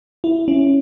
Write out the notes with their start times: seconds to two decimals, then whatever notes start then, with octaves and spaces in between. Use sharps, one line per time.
0.24 E4
0.48 C#4